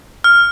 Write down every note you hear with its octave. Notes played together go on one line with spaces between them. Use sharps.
F6